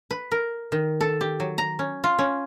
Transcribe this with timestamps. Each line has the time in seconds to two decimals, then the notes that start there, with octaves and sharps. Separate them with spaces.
0.11 B4
0.31 A#4
0.72 D#3
1.01 A4
1.21 G4
1.40 F#3
1.58 A#5
1.79 C#4
2.04 F4
2.19 C#4